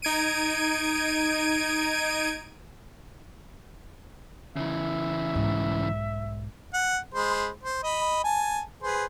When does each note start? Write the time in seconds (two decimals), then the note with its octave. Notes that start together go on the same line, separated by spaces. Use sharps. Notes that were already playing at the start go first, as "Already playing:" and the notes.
0.02 D#4 G#6 D7 D#7
4.56 C#3 E3 E5
5.34 B1 G#2
6.73 F#5
7.14 G#3 C5 B5
7.63 C5
7.83 D#5 B5
8.24 G#5 A5
8.83 G#4 B4 C5